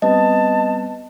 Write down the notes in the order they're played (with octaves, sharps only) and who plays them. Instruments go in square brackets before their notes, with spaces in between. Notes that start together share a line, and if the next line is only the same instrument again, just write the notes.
[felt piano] G3 B3 C4 [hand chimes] D#5 [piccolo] A5